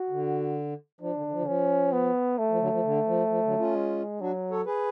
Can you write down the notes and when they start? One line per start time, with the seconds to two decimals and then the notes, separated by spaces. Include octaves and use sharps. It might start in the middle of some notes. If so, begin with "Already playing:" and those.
Already playing: F#4
0.10 D3
1.01 F3 D4
1.16 D3
1.26 D3
1.32 F3
1.40 D3
1.47 F3 C#4
1.92 B3
2.38 A3
2.50 F3
2.60 D3 F#3
2.72 F3
2.84 D3
3.07 F3
3.29 F3
3.44 D3 F#3
3.59 C#4 F4
3.75 G#3
4.21 F#3 D4 F#4
4.51 A4 C#5
4.66 G#4 B4